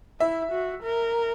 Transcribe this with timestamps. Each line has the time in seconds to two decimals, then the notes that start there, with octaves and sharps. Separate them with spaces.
0.20 E4 E5
0.52 F#4
0.83 A#4